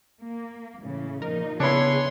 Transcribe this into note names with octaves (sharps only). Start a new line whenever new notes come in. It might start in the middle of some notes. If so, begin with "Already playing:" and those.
A#3
A2 C#3 E3
A#2 F3 D#4 A#4
C#3 B3 D4 E4 G#4 C#5 C6